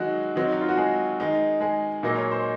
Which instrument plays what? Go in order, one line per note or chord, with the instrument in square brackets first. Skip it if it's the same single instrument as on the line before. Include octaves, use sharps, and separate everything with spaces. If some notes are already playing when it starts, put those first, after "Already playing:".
Already playing: [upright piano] D#3 F#3 G#3 D#4 F#4
D#3 F#3 C4 D#4
D#4
F4
F#4
G#3 G#4
D#3 G#3 D#4
G#3 G#4
A#2 F#3 A#3 D#4 D#5
C#5
C5